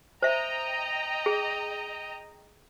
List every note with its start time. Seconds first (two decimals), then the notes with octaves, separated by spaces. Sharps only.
0.22 C5 D#5 E5 G5 A#5
1.26 G#4